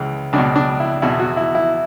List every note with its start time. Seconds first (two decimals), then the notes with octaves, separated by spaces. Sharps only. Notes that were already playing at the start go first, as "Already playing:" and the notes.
Already playing: C#2 C#3 E3 C#4
0.33 C#2 B2 D4
0.56 D4
0.80 E4
1.02 E2 B2 E4
1.19 F#4
1.37 E4
1.55 E4